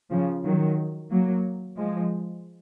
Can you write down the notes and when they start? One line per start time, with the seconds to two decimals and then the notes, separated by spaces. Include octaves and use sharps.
0.11 C#3 F3
0.44 D#3 F#3
1.10 F#3 A#3
1.77 F3 G#3